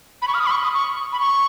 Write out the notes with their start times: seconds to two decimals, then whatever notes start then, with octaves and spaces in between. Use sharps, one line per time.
0.22 B5
0.28 C#6
0.34 F6
0.40 D#6
0.46 B5
0.51 C#6
0.63 D#6
0.74 C#6
1.12 B5
1.20 C#6